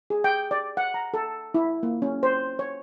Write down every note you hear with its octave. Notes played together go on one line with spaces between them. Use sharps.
G#4
G5
D5
F#5
A#5
A4
E4
A#3
C#4
C5
C#5